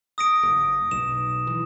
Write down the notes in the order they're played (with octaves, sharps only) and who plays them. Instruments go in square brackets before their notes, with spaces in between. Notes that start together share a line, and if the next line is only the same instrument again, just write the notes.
[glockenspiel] D#6 A#6 D7
[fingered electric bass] F#1
[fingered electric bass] B1 [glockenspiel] E7
[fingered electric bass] E3